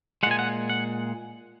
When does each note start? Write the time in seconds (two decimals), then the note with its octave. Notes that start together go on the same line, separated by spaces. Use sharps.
0.23 G#3 F#5
0.26 A#2 G#5
0.39 F#5
0.69 F#5